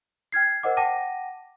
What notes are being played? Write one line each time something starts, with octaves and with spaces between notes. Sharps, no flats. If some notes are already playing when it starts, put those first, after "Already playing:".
G5 F6 G#6 C7
A#4 C5 D#5 F#5 D6
F#5 G5 A5 D6 A#6 D#7